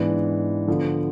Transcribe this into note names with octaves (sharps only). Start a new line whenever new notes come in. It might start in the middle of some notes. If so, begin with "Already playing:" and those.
Already playing: G#2 E3 B3 D4
D3 F3 B3